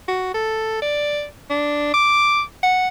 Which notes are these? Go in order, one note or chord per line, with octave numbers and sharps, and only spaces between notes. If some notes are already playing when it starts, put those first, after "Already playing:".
F#4
A4
D5
D4
D6
F#5